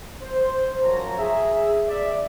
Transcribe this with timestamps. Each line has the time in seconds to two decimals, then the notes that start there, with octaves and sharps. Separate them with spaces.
0.22 C5
0.83 F#2 F3 C#5 A#5
1.18 G#4 E5
1.88 D5 E5